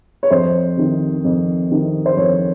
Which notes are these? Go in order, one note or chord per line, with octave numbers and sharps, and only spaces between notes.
C#5
F2 C5
C3 D#3
F2
C3 D#3
C5
F2 C#5